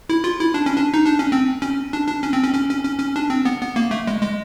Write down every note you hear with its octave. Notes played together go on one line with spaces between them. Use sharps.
E4
F4
E4
D4
C#4
D4
D#4
D4
C#4
C4
C#4
D4
D4
C#4
C4
C#4
C#4
C#4
C#4
C#4
D4
C4
B3
B3
A#3
A3
G#3
G#3